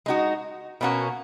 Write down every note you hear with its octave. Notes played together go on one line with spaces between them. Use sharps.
G#3 D#4 F#4
B2 A#3 C#4 F#4